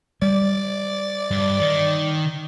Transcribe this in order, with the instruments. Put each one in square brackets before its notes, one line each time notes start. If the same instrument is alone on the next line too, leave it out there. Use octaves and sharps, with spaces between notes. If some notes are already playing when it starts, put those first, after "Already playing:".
[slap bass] G3 [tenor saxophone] D5
[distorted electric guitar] G2
D#3